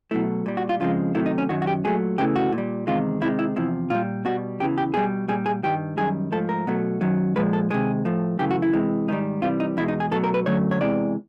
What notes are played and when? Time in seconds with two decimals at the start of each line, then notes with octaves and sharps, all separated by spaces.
0.11 B2 F#3 A3 E4
0.46 A#2 G3
0.57 F#4
0.69 F4
0.80 F2 C#3 F3 G#3 F4
1.15 C3 D#3 F#3 A3 E4
1.26 D#4
1.38 C#4
1.49 F#2 D#3 F#3 F#4
1.62 F#4
1.67 G4
1.84 A#2 F#3 A3 G#4
2.18 E2 C#3 E3 A3 G4
2.36 F#4
2.52 A#2
2.58 G3
2.87 E2 C3 D#3 G#3 F4
3.21 C3 D#3 G#3 E4
3.39 E4
3.56 E2 C3 F3 E4
3.90 A#2 G3 F4
4.25 B2 G3 F#4
4.60 E2 C#3 E3 G4
4.78 G4
4.94 B2 G3 G#4
5.28 A#2 G3 G#4
5.46 G#4
5.63 G2 D#3 G3 G4
5.97 F#2 D#3 G3 G#4
6.32 G#2 F3 A3 A4
6.49 A#4
6.67 B2 F#3 A3
7.01 F#2 D#3 F#3
7.36 A#2 F3 G#3 B4
7.53 A4
7.70 C3 D#3 G#3 G#4
8.05 A2 F3 A3
8.39 F#2 C#3 E3 A3 G4
8.51 F#4
8.62 E4
8.73 C3 E3 G#3
9.08 G#2 D#3 G3 D#4
9.42 C3 E3 G3 F4
9.60 D#4
9.77 E2 B2 G#3 E4
9.88 D#4
10.00 G#4
10.11 B2 F#3 A3 A4
10.24 A#4
10.34 B4
10.46 F#2 D3 F#3 A3 C#5
10.71 C#5
10.81 E2 C3 E3 G#3 D5